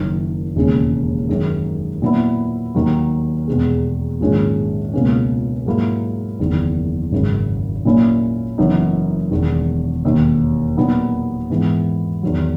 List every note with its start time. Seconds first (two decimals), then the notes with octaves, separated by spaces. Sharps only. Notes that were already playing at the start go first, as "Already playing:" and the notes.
Already playing: F#1 F#2 D#3
0.56 E1 D#2 C#3 G#3 C#4
1.29 F#2 D#3 G#3 D#4
2.02 A#2 F#3 B3 E4
2.75 D#2 D#3 F#3
3.47 E2 B2 G#3
4.20 A#1 G#2 D#3 G#3 C#4
4.93 C#2 B2 A#3 C#4
5.66 G#2 F#3 A#3 E4
6.39 F#1 E2 D#3
7.12 G#1 F#2 C#3
7.85 A#2 F#3 A#3 C#4 E4
8.58 F#1 F#2 E3 B3 D#4
9.31 E1 E2 D#3
10.04 E1 D#2 D#3
10.77 A#2 F#3 B3 D#4
11.50 G#2 E3 B3
12.23 E2 D#3 F#3